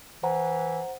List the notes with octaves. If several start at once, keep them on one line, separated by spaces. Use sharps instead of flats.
E3 C5 F#5 A#5